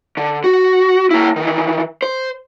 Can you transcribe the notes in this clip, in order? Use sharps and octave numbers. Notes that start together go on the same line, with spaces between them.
D3
F#4
A#3 E4
D#3 E3
C5